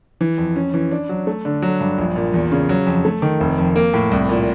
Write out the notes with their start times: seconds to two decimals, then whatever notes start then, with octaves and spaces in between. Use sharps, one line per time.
0.21 E3
0.38 F2
0.56 C#4
0.74 E3
0.91 D4
1.09 F#3
1.27 A3
1.45 D3
1.62 F#3
1.80 G2
1.98 A#1
2.16 A#2
2.34 E2
2.52 C#3
2.69 F#3
2.87 F2
3.05 A3
3.22 D#3
3.40 F1
3.58 F2
3.76 A#3
3.93 A2
4.11 C2
4.29 A#2